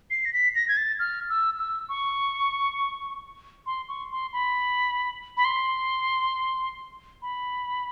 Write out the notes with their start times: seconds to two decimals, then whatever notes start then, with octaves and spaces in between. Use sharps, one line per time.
0.11 C7
0.25 A#6
0.33 B6
0.55 A#6
0.68 G#6
0.77 A6
0.99 F6
1.30 E6
1.59 E6
1.89 C#6
3.66 C6
3.88 C#6
4.11 C6
4.33 B5
5.37 B5
5.45 C6
7.22 B5